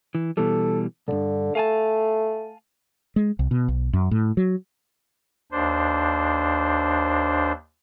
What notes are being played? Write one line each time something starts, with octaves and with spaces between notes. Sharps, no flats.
E3
B2 E3 G3 A4
B1 G2 D3
A3 F5 G#5 A5
G#3
C2
B2
B1
F#2
A2
F#3
D#2 D4 C5